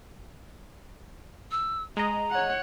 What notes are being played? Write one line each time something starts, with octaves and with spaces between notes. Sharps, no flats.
E6
G#3 D#5 A#5
C#5 F#5